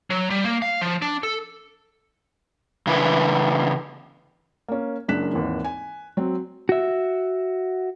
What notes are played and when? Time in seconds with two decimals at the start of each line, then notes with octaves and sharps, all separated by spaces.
0.10 F#3
0.30 G3
0.44 A#3
0.62 F5
0.81 F3
1.02 D4
1.23 A4
2.87 C#3 E3 D4 E4 B4
4.68 A#3 C#4
5.08 F#1 F#2 D4 F#6 B6 E7
5.33 G#1 D#2 E3
5.64 G#5
6.17 F#3 C4
6.69 F#4 E5